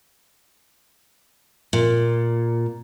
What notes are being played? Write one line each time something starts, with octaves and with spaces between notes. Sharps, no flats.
A#2